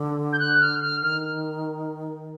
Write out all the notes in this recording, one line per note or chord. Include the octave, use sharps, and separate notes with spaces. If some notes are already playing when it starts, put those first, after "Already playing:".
Already playing: D3
G6
F#6
F6
F6
D#3 F6